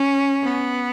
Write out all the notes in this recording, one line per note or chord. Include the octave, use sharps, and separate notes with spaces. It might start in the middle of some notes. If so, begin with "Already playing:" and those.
Already playing: C#4
B3